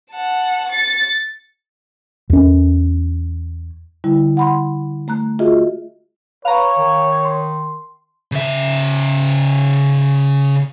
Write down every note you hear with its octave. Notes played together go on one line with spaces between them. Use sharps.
F#5 A5
A6 C#7
E2 C#4
D3 G3 E4
F#5 B5 C6
A3 A#5 F#6
F4 F#4 G#4 D#5 E5
B4 C#5 F5 A#5
D#3
C6
C#3 E5